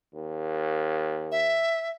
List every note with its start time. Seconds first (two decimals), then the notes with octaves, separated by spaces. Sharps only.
0.14 D#2
1.32 E5